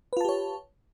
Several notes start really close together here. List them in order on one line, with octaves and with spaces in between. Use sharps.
B4 F4 A5 G4 C#5